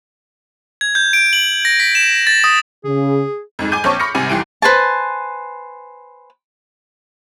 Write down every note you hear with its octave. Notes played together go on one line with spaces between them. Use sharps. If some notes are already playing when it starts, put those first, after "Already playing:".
G#6
G6
D7
F#7
A#6
B6
E7
A6
D#6
C#3 G#4
F2 G#2 G#3
G#5 D6 G6 D#7
A#1 C4 C#5 A5 C#6
B5 C#6 D6 F6 A#6 C#7
G#1 C3 G3 G#5
F1 C2 E3 G4 D7
B4 C5 G#5 A5